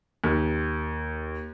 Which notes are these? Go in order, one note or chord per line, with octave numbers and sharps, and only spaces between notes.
D#2